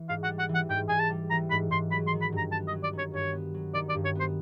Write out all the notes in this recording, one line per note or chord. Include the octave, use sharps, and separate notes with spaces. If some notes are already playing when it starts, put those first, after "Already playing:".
Already playing: E3
G#2 F5
F#5
G3
F#5
E3
F#5
G#2 G5
G#2 G#5
A5
G3
E3 A#5
G#2 B5
G#2 C6
F#3 B5
C6
D#3
B5
G2 A#5
B3 A5
D#5
F#3
D5
D#3
C#5
G2 C#5
B3
F#3
D#3 D5
D5
G2
C#5
B3 C5